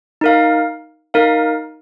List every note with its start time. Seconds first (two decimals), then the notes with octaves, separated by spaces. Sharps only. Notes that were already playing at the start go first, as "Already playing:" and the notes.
0.21 D#4 A#4 F5
1.14 D#4 A#4 F5